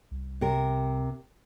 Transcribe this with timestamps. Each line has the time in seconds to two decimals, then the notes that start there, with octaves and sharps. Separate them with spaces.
0.11 C2
0.41 C3 A#4